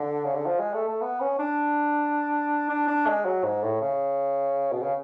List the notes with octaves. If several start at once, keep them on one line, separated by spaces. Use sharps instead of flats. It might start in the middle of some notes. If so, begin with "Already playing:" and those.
Already playing: D3
C#3
D3
F3
G#3
A3
A3
B3
C#4
D4
D4
D4
G#3
F#3
G#2
A2
C#3
B2
C#3